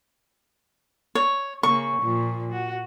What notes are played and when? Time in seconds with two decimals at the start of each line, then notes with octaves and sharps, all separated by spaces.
1.15 C#5
1.63 C#3 A#3 C#6
2.01 A#2 F3
2.52 F#4